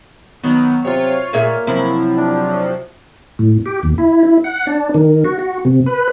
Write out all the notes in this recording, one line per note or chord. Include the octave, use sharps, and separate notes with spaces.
D#3 F#3 B3
C3 F4 C#5
A#2 A#3 G#4 E5
C3 F3 F#3 E4
D4
A2
G4
D#2
E4
E4
F#5
D4
D#3
F#4
F#4
C3
B4